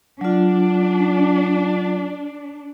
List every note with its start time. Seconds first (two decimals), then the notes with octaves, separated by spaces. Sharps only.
0.21 F#3 D4 F4